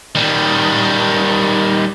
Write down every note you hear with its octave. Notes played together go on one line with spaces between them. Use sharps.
D#3 G3